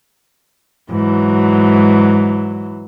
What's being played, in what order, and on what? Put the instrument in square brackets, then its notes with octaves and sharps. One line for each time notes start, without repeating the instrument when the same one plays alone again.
[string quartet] G#2 E3 F#3